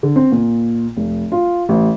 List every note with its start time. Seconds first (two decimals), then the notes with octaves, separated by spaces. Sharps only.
0.03 D3
0.16 C4
0.32 A#2
0.97 F1
1.32 F4
1.69 A1